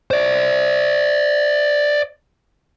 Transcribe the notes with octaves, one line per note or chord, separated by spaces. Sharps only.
C5 D5